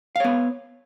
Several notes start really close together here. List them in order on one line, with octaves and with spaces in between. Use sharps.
F5 C#5 B3